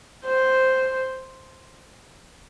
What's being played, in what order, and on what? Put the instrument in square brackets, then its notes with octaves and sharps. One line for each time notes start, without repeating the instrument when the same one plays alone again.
[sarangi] C5